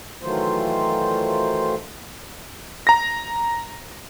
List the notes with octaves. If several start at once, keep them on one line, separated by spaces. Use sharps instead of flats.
D#3 E3 F#3 A3 F4 C5
A#5 A#6